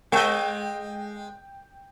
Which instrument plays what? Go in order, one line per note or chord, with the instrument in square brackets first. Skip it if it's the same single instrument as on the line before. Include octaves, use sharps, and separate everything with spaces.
[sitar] G#3 D#5 [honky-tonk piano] G5